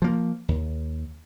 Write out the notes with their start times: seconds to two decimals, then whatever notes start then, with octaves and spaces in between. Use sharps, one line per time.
0.02 F3 A#3
0.48 D#2